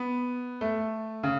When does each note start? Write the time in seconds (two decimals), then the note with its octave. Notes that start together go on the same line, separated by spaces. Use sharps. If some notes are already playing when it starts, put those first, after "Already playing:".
Already playing: B3
0.61 A3
1.23 C#3